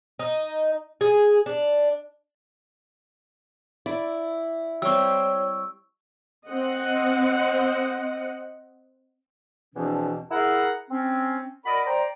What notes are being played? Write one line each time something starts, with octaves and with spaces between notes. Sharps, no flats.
D#4
G#4
D4
E4 D5
G3 C4 C#5 C#6 E6
C4 D#5 F#5
E2 B2 E3 F3 C4 D4
E4 G#4 A#4 F#5 A#5
C4 C#4
F#4 A#4 D5 D#5 B5
C5 D5 G5 A#5